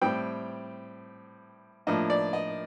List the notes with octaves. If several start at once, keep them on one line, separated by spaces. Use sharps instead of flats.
A2 G3 C4 G5
A2 F3 A#3 D4 D#5
D5
D#5